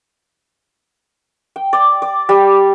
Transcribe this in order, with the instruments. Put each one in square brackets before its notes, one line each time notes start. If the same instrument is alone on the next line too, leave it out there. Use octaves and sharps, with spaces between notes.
[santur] G5
D5
D5
G3